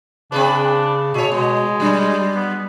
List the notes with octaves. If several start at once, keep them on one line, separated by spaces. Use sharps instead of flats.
C#3 C4 D4 G#4 B4
B2 A3 G#4 C#5
B2 G#3 B3
F#3 G3 D4
B3